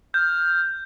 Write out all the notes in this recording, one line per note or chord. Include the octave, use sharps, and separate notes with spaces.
F6 G6